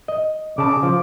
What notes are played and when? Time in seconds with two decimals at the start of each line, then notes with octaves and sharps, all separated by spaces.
0.08 D#5
0.58 C#3 A5 D6
0.83 F3